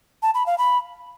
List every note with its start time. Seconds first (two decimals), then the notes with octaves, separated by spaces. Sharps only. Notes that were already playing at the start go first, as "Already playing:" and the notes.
0.22 A5
0.34 B5
0.46 F5
0.58 B5